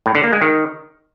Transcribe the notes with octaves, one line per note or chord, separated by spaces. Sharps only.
A2
D3
A#3
G#3
D#3